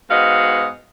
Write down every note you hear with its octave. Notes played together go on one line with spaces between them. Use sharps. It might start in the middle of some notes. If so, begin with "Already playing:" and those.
G#2 B3 F#4 D#5 F5